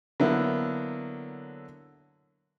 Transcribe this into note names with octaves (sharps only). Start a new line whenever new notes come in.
D3 F#3 A#3 B3 E4